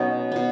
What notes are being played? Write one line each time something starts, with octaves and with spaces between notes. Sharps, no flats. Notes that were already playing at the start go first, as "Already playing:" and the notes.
Already playing: B2 F#3 B3 C#4 D#4
B2 B3